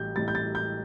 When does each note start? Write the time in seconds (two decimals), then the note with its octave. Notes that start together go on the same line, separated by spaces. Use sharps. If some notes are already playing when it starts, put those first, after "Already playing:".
Already playing: A1 A2 G3 G6
0.16 A1 A2 G3 A6
0.28 G6
0.35 A6
0.55 G6